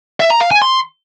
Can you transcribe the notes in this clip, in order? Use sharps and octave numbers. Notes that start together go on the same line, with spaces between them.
E5
A#5
F5
G#5
C6